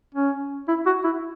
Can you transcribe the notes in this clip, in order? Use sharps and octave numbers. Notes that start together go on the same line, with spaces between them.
C#4
E4
F#4
E4